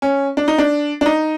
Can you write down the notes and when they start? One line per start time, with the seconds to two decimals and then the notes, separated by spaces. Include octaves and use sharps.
0.02 C#4
0.37 D4
0.48 D#4
0.58 D4
1.01 D4
1.06 D#4